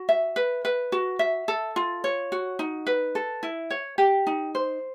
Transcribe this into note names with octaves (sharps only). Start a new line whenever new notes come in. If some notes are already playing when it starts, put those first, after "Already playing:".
Already playing: F#4
E5
B4
B4
F#4
E5
A4
F4
C#5
F#4
D#4
B4
A4
E4
C#5
G4
D#4
C5